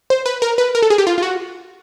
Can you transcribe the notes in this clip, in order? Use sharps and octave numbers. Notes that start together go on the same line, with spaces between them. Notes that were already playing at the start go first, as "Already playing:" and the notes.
C5
B4
A#4
B4
A#4
A4
G#4
G4
F4
F4
F#4